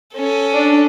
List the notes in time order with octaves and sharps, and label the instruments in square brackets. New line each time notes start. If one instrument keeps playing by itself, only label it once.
[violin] C#4 A4
[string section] D4